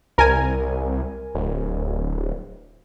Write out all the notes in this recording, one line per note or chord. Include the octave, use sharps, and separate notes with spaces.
C2 A#4 G#5
D1